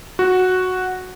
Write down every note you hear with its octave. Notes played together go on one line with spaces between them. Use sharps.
F#4